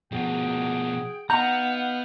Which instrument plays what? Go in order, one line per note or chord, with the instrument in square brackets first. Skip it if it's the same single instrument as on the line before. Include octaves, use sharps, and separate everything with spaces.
[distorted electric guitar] B2 F3 [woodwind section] F#4 G#4 G5
[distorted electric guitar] B3 [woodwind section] D#4 F5 F#5 [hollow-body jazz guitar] A#5 [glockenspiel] G6 F7